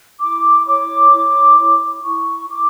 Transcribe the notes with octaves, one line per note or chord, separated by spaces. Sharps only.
E4 D6
C#5 D6
E4
E4
E4 C#6
E4 D6